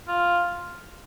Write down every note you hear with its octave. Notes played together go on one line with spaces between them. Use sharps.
F4